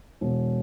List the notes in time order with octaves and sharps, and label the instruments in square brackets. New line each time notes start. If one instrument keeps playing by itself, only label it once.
[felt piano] E1